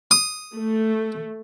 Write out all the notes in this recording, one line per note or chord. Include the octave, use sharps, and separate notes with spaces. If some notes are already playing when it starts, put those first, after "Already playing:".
D#6
A3